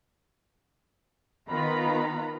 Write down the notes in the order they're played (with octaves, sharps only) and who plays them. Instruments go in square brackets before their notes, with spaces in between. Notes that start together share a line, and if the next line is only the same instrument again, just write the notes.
[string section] D#3 B3 F4 A#5 B5